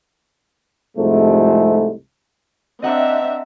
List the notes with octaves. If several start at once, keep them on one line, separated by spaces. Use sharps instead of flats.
C2 F2 G#2 C3 G#3 A3
C4 D4 D#5 E5 F#5 A#5